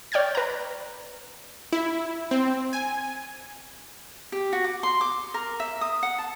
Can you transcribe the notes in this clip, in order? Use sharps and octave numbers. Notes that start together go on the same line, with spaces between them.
C#5 D5 G5 F6 G#6 A6
B4 A#5
E4
C4
G#5
G4
F#4
D6
C6
D6
A#4
E5
D#6
F#5
A5